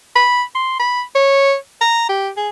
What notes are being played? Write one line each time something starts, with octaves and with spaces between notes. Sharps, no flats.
B5
C6
B5
C#5
A#5
G4
G#4